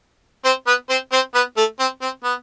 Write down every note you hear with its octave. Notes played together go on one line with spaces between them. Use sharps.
C4 C5
B3 B4
C4 C5
C4 C5
B3 B4
A3 A4
C4
C4
B3